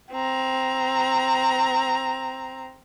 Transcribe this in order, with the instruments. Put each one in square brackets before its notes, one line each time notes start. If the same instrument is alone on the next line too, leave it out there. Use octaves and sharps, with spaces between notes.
[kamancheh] C4 A#5